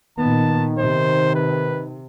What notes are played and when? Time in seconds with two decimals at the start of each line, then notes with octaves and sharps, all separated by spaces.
0.18 A#2 D#3 B3 A5
0.78 C3 C5
1.35 B4